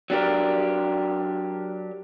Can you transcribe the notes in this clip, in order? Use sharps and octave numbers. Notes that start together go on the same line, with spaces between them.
F#3 D4 G4 A#4